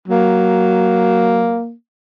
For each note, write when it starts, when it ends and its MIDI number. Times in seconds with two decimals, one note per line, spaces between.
0.08 1.59 54
0.08 1.73 58